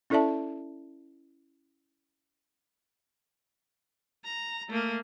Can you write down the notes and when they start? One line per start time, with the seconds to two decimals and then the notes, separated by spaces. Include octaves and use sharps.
0.10 C#4 E4 A4 D5 E5 A5
4.25 A#5
4.69 A3 A#3